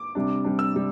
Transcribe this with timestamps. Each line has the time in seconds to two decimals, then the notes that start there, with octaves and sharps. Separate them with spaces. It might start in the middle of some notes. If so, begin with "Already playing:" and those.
Already playing: D6
0.15 C3 G3 D4
0.45 C3 G3 D4
0.59 E6
0.74 C3 G3